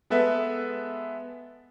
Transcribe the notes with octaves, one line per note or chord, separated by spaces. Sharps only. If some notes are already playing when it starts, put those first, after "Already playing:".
G#3 B3 A4 B4 E5